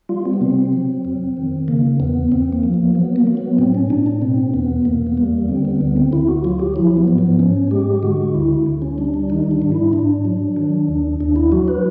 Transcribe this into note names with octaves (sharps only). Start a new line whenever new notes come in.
G3 F4
C4
B3
C3 C4
F#3
F2
D#3
C#3 A#3
E2 B3
E2 C4
A#3
F3
A#3
F#3 B3
A#3
F#3
B3
A2 C4
C#4
A2 D4
D4
B2 C4
E2 B3
E2 A#3
B3
G3 A#3
D3 C4
B3
D2 B3
C4
D2 E4
F#4
F#3 F4
G4
F3 E4
B3
G#2
B3
G#2 C#4
G#3 G4
D3 F#4
D2 E4
D2
C#4
G3 D4
D4
D#3 D#4
D4
G#2
E4
G#2 D4
F#3
D#3
D#2
D#2 D4
E4
F#3 F#4
B4